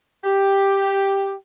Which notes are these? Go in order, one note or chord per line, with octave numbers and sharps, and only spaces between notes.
G4